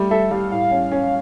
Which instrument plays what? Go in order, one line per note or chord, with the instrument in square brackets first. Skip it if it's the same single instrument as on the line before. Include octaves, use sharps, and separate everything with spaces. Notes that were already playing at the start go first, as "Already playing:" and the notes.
Already playing: [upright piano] G3 A3
[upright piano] A4 [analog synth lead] E5
[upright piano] G3 [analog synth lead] F5
[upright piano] A2 [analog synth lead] F5
[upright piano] C#4
C#4